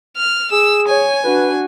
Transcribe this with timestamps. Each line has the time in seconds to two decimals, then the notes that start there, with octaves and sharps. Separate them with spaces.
0.17 F6
0.52 G#4 E6
0.88 C#5 G#5
1.24 D4 F#4 B4